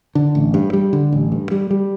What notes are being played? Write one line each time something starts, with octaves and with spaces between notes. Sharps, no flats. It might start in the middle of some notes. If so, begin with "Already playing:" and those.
D3
A1
G2
G3
D3
A1
G2
G3
G3